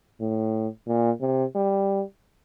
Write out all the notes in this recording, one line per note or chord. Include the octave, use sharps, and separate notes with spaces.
A2
A#2
C3
G3